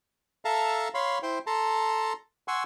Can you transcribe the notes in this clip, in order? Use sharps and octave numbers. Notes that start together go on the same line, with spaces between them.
A4 E5 F5 A5 A#5
C#5 F5 B5 C6
E4 C5 G5 C6
A4 A5 A#5 C6
F#5 G#5 C6 C#6 E6